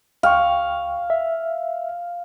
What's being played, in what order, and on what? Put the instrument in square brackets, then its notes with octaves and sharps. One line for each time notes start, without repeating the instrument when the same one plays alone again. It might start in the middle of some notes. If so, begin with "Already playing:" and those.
[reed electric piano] C#2 G5 C#6 [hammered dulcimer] F5
[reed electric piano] E5